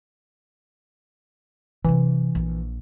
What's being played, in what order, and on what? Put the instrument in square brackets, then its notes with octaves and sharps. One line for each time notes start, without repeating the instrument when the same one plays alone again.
[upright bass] C3 F#3 [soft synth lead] E3
[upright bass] A#1